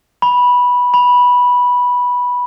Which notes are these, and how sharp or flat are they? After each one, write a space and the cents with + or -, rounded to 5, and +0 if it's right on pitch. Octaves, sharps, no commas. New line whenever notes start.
B5 -10
B5 -10